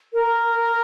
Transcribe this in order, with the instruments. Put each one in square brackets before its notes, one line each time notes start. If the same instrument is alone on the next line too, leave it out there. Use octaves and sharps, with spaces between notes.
[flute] A#4